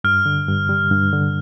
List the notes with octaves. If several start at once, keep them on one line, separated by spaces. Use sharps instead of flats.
G2 F6
D3
G2
G3
G2
D3